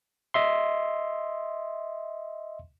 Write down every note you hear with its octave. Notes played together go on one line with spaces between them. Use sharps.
D#5 E5 C6